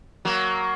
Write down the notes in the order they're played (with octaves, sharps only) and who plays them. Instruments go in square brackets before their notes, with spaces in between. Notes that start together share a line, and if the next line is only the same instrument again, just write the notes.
[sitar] F#3 A#3